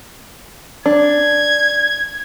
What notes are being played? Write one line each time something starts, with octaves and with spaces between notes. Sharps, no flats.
D4 G#6